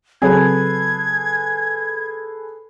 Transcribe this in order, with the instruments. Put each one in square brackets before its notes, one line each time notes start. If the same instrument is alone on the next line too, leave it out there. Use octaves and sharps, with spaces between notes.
[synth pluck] C#3 F#3 C4 [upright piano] G#4 A4 B4 [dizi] G#6